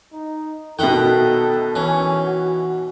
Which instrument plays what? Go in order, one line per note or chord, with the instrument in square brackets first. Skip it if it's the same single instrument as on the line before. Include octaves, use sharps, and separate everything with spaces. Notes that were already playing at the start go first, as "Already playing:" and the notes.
[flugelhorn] D#4
[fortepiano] B2 D#3 [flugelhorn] A4 [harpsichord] E5 F#5 G5
[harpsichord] E3 [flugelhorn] C#4
[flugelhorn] F#4